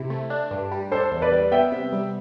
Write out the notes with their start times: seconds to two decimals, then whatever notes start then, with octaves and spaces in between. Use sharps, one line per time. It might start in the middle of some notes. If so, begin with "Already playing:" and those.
Already playing: C3 E4
0.10 A3
0.30 D4
0.51 G2
0.72 G3
0.92 D4 A4 C5
1.11 E2
1.22 B4 D5
1.32 G3
1.52 B3 E5 G5
1.72 C3
1.92 G3